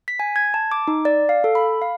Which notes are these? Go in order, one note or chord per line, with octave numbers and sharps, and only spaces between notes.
B6
G#5
G#6
A5
D6
D#4
D5
F5
A4
B5
F5